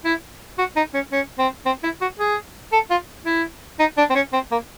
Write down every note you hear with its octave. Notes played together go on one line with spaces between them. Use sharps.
E4
F#4
D#4
C#4
C#4
C4
C4
E4
F#4
G#4
A4
F4
E4
D#4
D4
C4
C#4
C4
A#3